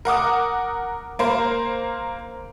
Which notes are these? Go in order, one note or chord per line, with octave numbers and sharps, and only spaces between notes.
A#4 F#5 D6 D#6
A#3 A#4 C5